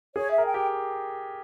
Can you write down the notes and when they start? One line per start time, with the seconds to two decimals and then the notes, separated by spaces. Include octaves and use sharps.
0.15 G#4 C#5
0.30 E5
0.38 A#4
0.46 G5
0.54 G4